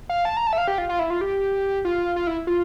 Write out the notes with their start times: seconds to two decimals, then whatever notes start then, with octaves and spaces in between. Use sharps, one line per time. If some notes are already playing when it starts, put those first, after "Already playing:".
0.09 F5
0.25 A5
0.37 A#5
0.47 A5
0.53 E5
0.58 F5
0.68 G4
0.78 F4
0.89 F4
0.99 E4
1.10 F4
1.21 G4
1.85 F4
2.16 F4
2.27 E4
2.47 F4